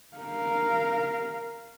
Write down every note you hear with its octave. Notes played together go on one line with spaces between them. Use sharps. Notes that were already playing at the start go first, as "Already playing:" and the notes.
A#4 F5